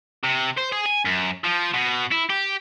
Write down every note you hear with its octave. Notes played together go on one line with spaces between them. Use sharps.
C3
C5
G#4
G#5
F#2
F3
B2
E4
G4